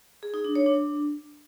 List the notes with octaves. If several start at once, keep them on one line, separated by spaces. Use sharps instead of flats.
G#4
D#4
D4
C#5
D4